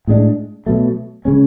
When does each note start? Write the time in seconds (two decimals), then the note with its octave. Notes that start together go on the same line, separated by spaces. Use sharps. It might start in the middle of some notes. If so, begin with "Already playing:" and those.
0.07 A2 G#3 D4
0.66 B2 F#3 A3
1.25 C#3 G#3 C#4